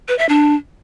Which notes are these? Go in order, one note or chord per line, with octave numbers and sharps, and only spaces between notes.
B4
E5
D4